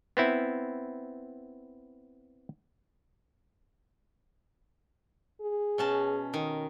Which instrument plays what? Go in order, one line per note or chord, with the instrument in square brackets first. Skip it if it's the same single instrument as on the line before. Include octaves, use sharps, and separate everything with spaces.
[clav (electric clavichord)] B3 C4 E4
[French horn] G#4
[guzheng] B2 C#4 A5
D#3